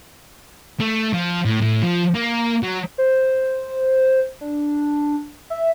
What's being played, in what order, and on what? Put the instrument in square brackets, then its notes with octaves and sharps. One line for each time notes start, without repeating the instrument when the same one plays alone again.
[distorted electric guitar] A3
F3
A2
A2
F3
A#3
F#3
[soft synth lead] C5
D4
E5